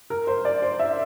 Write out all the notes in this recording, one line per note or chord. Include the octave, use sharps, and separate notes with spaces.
A#4
C5
D5
C5
E5